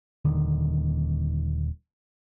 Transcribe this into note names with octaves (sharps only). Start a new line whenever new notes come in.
D#1 D3 D#3